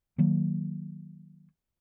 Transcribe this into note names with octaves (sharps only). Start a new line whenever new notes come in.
D#3 F#3 A#3